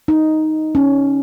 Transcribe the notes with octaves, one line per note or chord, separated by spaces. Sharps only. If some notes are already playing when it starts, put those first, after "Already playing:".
D#4
C#4